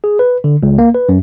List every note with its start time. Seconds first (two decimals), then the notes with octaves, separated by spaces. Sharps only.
0.04 G#4
0.19 B4
0.44 D3
0.63 C#2
0.78 A#3
0.94 B4
1.09 F#2